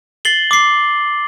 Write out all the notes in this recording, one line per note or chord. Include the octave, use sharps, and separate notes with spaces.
A6 C7 F#7 G7
D6 C7